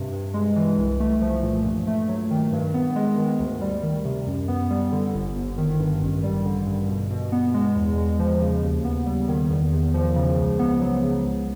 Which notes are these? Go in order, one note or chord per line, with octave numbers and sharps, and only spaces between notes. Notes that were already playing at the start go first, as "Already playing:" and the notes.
Already playing: G2 C3
G2
G#3
E3
C2
A3
F3
A#2
G2
A3
F#3
D#3
G2
B3
G#3
D#3
D2
G3
D#3
C3
F#2
B3
G3
D3
G1
G1
D#3
G2
A1
G3
D3
G2
B2
B2
B3
G#3
E2
G#3
F3
C#3
D#2
B3
G3
D#3
E2
E2
F3
C#3
C#2
B3
F#3
C#3
C#2